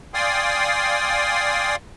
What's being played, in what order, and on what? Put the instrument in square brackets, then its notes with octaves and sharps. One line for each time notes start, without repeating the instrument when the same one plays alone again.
[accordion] D5 F5 G5 G#5 C6 D#6